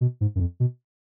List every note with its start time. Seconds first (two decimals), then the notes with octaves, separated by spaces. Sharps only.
0.01 B2
0.21 G#2
0.35 F#2
0.40 F2
0.60 B2